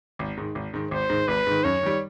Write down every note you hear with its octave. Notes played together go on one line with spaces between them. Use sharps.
G#1
G#2 D#3
G#1
G#2 D#3
G#1 C5
G#2 D#3
G#1 B4
G#2 D#3
F#2 C#5
D#3 G3